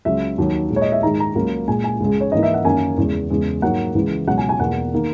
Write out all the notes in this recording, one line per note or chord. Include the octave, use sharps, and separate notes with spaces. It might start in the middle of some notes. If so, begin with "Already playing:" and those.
C#2 C#3 F#3 E5
D#2 D#3 F#3
A#2 G#3
C#5
D#5
E5
G#2 D#3 G#3 A#5
A#5
C#2 C#3 F#3 A#3
A#2 G#3 G#5
G#5
C#2 C#3 G#3
C#5
G#2 E3 A#3 D#5
E5
F#5
F#2 D#3 A#3 G#5
E2 C#3 E3 G#3
E2 C#3 G#3
G#2 F#3 A#3 F#5
C#2 C#3 E3 G#3
C#2 B2 F#3 F#5
G#5
G#5
E2 B2 A#3 F#5
D#3 A#3